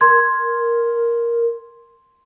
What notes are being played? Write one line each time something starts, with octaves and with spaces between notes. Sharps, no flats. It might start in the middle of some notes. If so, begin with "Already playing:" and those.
A#4 C6 G#6